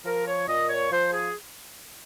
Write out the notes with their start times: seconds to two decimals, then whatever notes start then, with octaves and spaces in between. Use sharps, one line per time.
0.05 F3 A#4
0.27 C#5
0.48 A#2 D#5
0.70 C#5
0.92 F3 C5
1.13 G#4